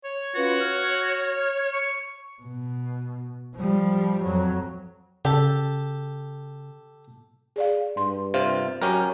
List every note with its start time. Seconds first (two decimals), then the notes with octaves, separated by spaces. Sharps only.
0.04 C#5
0.35 C#4 F4 F#4 B4
0.60 F6
1.73 C#6
2.42 B2
3.56 F3 G3
4.23 F2 F#3
5.25 C#3 G4 A4
7.56 G#4 D5 F5
7.97 G2 C6
8.34 C3 F4 C5
8.82 F#3 C#4 G4 A#4